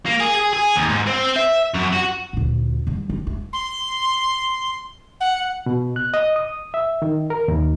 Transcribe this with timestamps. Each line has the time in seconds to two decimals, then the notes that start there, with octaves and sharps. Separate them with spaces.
0.06 A#3
0.21 G#4
0.35 G#4
0.53 G#4
0.76 D#2
0.89 G#2
1.07 C4
1.36 E5
1.74 F#2
1.93 F#4
2.33 D2 A#2
2.87 D#3 G3
3.09 D#3
3.27 G#3 A3
3.53 C6
5.20 F#5
5.66 B2
5.96 F#6
6.14 D#5
6.36 D#6
6.74 E5
7.02 D#3
7.30 A#4
7.48 D#2